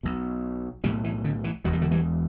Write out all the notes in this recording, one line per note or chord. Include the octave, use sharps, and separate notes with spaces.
B1 B2
B1 A2 E3 G3
E3
D3
E3
E1 E2 B2 F#3
G3
D3 F#3
E3 G3